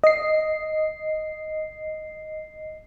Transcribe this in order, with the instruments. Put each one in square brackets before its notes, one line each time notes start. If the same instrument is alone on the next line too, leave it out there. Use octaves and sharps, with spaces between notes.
[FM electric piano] D#5 C7